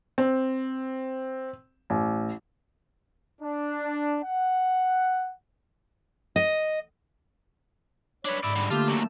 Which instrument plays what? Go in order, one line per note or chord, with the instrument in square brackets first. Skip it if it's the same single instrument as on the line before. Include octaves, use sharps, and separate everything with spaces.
[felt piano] C4
A1
[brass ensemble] D4
F#5
[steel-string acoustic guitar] D#5
[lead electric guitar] D4 B4 [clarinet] C#5
[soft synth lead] G#2 [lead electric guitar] D5 E5 [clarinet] B5
[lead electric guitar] D3 G3
[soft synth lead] D3 [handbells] A3 A#3 A5 [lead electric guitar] F4 [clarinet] G4
[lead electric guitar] D#2 F#3